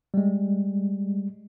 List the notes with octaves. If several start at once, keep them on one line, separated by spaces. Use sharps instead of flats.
G3 G#3